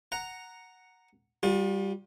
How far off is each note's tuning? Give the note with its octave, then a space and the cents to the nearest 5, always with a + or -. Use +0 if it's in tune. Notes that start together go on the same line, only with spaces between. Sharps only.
F#5 +0 A#5 +0
G3 +0 F4 +45